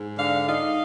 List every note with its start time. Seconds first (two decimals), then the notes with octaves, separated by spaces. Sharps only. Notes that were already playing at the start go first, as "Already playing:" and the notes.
Already playing: G#2
0.17 D3 F5
0.47 D#4 F5